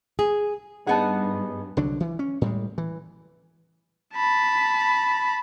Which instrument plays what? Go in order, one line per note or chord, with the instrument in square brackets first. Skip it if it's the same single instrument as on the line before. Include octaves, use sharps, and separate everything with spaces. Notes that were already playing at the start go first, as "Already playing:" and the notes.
[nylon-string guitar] G#4
[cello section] G2 [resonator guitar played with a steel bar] B3 D#4 G#4 [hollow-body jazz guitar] F#5 A5
[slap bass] C2 D3 F#3 D4
E3
C#4
A2 G3 G#3
E3
[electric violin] A5 B5